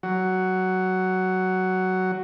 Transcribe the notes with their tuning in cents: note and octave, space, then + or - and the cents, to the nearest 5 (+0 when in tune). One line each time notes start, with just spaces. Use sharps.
F#3 +10